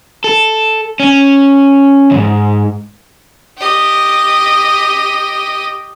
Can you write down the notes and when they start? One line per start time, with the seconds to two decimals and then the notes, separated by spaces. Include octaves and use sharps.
0.24 A4
1.00 C#4
2.11 D#2 G#2
3.58 G4 D#5